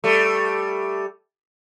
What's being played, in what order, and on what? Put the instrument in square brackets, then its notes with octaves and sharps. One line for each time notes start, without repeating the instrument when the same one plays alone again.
[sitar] G3 A3